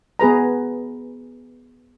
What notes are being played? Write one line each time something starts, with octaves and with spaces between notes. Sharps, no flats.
B3 G#4 B4 A#5